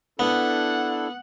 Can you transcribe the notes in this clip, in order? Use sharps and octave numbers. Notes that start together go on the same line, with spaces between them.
B3 D4 E4 A4 F#5